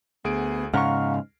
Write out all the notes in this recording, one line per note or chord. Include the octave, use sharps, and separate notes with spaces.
D2 B3 G#4 D7
G#2 C#3 F5 F#5 A#5 C#6 F6